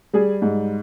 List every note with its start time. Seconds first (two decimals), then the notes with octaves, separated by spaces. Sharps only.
0.13 G3 G#4
0.42 G#2